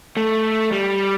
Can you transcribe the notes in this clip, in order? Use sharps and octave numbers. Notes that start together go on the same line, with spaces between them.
A3
G3